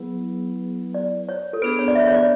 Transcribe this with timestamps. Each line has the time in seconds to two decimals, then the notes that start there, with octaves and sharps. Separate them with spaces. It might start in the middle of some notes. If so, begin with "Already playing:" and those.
Already playing: F#3 B3 E4 G#4 B4
0.94 D5
1.29 C#5
1.53 A4
1.62 B3 D4 G#4 B4
1.79 C#5
1.88 D5
1.95 E5
2.07 C#5
2.13 D5